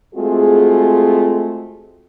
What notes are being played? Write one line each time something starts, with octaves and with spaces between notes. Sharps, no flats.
G#3 A3 C4 F4 F#4 G#4